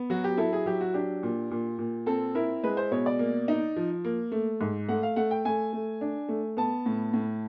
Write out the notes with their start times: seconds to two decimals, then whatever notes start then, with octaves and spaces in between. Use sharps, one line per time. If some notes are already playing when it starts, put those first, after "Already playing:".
Already playing: B3
0.10 F#3 F#4
0.24 G4
0.37 E4 A4
0.53 G#4
0.66 F#3 G4
0.81 F#4
0.94 D4 G4
1.23 A#2
1.51 A#2
1.79 A#2
2.06 C4 A4
2.35 E4 A#4
2.63 G#3 B4
2.77 C5
2.91 B2 C#5
3.06 D5
3.19 A#3
3.48 D#4
3.76 F3
4.04 A#3
4.32 A3
4.61 G#2
4.89 A3 F#5
5.03 F5
5.16 A3 F#5
5.31 G5
5.45 A3 G#5
5.73 A3
6.01 D4
6.29 A3
6.57 B3 A5
6.86 A2
7.13 A2